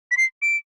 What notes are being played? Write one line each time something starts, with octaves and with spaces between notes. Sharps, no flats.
B6
C7
D7